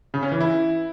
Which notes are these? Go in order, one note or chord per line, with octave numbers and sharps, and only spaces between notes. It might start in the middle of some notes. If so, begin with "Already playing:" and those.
C#3
C#4
E3
E4